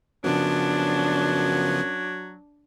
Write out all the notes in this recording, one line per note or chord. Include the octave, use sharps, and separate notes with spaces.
F#2 C#3 F3 F#3 B3 D4